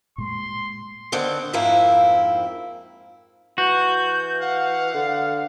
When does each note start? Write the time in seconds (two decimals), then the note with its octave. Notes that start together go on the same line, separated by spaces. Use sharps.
0.18 A#2 G#3 C6
1.12 D3 D#3 C4 D5
1.53 F2 G#2 A#3 C4 E4
3.58 E3 F#4 G6
4.40 F5 F#5
4.94 D3